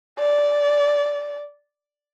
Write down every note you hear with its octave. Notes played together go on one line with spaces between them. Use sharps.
D5